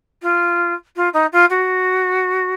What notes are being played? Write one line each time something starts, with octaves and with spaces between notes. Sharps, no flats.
F4
F4
D#4
F4
F#4